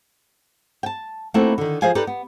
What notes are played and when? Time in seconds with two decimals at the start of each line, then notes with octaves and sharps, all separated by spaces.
0.83 G5 A5
1.34 A3 A#3 C4 D#4 E4 F#4
1.58 D3 D#3
1.82 F3 G#4 C5 F5 G#5
1.95 D#4 G4 A4 B4 D5 D#5
2.07 B3